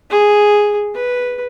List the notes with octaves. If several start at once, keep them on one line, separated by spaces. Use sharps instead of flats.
G#4
B4